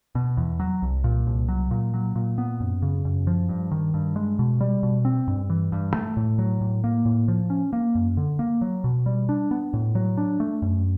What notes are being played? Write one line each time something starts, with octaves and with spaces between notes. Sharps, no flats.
B2
E2
F#3
C2
A#2
C2
F#3
A#2
F#3
A#2
B3
F#2
C#3
F#2
F3
G2
D#3
G2
G#3
B2
G3
B2
C4
G2
E3
G2
A3
A2
F#3
A2
A#3
A2
F3
C#4
A#3
F#2
D3
A#3
F#3
B2
G3
D4
B3
A2
F#3
D4
A3
F#2